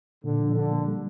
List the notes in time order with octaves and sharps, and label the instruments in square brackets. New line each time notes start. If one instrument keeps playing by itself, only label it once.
[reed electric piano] A#2 [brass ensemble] D3
[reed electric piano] F3
[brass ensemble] D3 [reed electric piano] D4
[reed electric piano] A#3
G3